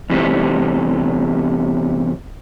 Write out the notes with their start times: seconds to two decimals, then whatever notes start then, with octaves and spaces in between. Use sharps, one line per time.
0.10 E2 C3 G3 A3